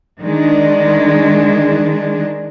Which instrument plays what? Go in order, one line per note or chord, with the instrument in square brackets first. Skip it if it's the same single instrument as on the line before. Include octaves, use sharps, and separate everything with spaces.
[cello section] D#3 G#3 D4